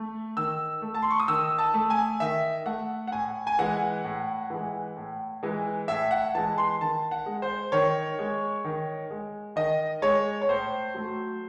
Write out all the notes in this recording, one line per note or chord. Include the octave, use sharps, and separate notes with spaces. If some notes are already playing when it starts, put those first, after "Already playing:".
Already playing: A3
D#3 E6
A3
A5
C6
C#6
D#6
D#3 E6
A5
A3
G#5
D#3 E5
A3 F#5
F#5
A2 G#5
G#5
E3 G#3 F#5
A2
E3 G#3
A2
E3 G#3
A2 E5
F#5
E3 G#3 A5
C6
D#3 A5
F#5
G#3
C5
D#3 C#5
G#3
D#3
G#3
D#3 D#5
G#3 C#5
C#5
A2 C5
F#3 A3